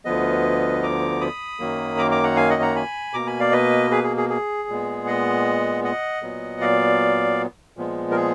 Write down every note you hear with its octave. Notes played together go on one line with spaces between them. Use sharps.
D2 D3 F3 B3 B4 D#5
A#5 D6
B5 D#6
F#2 D#3 F#3 A#3
A#5 D6
A#5 D6
F#5 A#5
F5 G#5
D#5 F#5
F#5 A#5
G#5 B5
B2 A#3 A#5 D6
G#5 B5
D5 F5
B4 D#5
G#4 B4
G#4
G#4
G#4
A#2 G#3 B3
D#5 F#5
D#5 F#5
A#2 F#3 B3
D5 F5
A#2 F3 G#3 B3
A#4
G#4